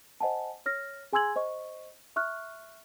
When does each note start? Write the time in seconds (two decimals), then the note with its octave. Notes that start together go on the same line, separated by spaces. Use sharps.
0.21 C5 D#5 F#5 G#5 A5
0.66 C#5 F6 A#6
1.13 G#4 G#5 C6 E6 G#6 F#7
1.36 C5 D#5 C#6
2.16 E5 C#6 F6 F#6